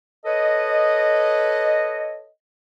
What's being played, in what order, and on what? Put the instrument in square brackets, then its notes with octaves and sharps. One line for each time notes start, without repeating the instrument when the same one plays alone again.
[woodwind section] A4 B4 C#5 D#5